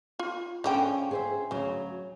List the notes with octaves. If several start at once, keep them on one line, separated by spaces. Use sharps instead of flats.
F4
D3 F3 C#4 G#4 C#5 G5
G#4 C5 E5
D2 C#3 F#3